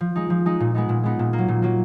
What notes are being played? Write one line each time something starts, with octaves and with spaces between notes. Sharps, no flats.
F3
G#3 D#4
F3
G#3 D#4
A#2
G#3 B3 D#4
A#2
G#3 B3 D#4
A#2
A#3
F#3
A#2
F#3 A#3